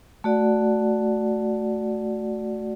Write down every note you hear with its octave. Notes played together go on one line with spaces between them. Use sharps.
A3 F#4 D5 F#5